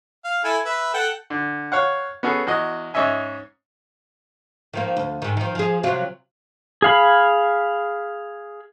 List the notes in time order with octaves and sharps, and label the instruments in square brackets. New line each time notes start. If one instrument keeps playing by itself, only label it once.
[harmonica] F5
E4 A4 G#5
B4 E5
A4 F#5 G5
[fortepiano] D3
C#5 F5 F#5
B3 C#4 F#4 G#4 A4
E2 F#4 D#5
G#2 C#4 C#5 D#5 E5 G#5
[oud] D#3 F3 A#3
D2
G#2 D#3
D#3 F3
F3 G#4
C3 F#3 F4
[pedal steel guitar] G#4 F5 B5